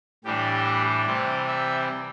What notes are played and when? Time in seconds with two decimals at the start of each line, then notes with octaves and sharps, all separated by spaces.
0.24 A2 E3 G3 D4 G4
1.06 C3 E3 G3 C4 G4
1.47 E5